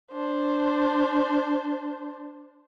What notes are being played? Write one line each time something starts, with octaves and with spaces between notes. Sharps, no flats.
D4 C5